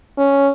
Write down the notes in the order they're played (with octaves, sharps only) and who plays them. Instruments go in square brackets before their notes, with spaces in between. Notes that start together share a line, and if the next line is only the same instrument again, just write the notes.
[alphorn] C#4